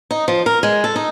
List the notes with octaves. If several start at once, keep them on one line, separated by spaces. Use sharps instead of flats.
D#4
F3
A#4
G#3
A4
D#4